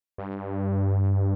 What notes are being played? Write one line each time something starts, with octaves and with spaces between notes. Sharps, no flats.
G2